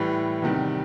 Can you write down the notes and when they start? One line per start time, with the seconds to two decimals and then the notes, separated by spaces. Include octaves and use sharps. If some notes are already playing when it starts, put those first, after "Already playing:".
Already playing: A2 E3 G3 B4
0.42 E2 C3 D#3 G3